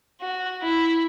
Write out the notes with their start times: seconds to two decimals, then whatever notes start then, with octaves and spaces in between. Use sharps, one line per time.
0.21 F#4
0.62 E4